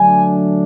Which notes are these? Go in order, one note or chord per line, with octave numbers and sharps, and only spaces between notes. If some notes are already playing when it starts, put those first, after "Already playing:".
Already playing: D3 F#3 A3 D4 G#5